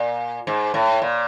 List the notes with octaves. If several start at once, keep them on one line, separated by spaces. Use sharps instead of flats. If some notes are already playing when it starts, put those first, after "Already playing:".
Already playing: A#2
G#2
A2
A#2